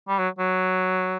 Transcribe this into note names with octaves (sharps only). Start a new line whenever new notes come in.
G3
F#3
F#3